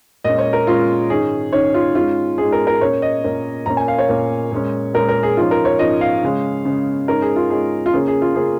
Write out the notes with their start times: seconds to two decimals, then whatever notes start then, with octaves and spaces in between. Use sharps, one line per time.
0.24 A#2 G#3 C#4 D#5
0.39 C#5
0.53 A#4
0.67 A#2 G#3 C#4 F4
1.10 G#2 D#3 C#4 G#4
1.53 G#2 D#3 C#4 C#5
1.74 F4
1.95 G#2 G#3 C#4 F4
2.38 G#2 G#3 C#4 G#4
2.52 A#4
2.67 A#4
2.81 A#2 A#3 C#4 C#5
3.02 D#5
3.24 A#2 A#3 C#4
3.66 A#2 A#3 C#4 A#5
3.77 G#5
3.88 F5
3.98 C#5
4.09 A#2 A#3 C#4
4.52 A#2 G#3 C#4
4.94 A#2 G#3 C#4 A#4
5.09 A#4
5.23 G#4
5.37 G#2 F3 C#4 F4
5.51 A#4
5.65 C#5
5.79 G#2 F3 C#4 D#5
6.01 F5
6.23 C#3 G#3 C#4
6.65 C#3 G#3 C#4
7.08 G#2 G#3 C#4 A#4
7.22 G#4
7.36 F4
7.50 G#2 G#3 C#4 G#4
7.86 F4
7.93 C#3 A#3 C#4 G#4
8.08 G#4
8.22 F4
8.36 C#3 A#3 C#4 G#4